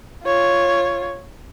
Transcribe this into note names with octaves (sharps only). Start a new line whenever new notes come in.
F4 C#5